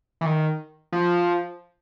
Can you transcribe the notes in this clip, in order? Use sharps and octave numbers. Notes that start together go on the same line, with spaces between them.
E3
D#3
F3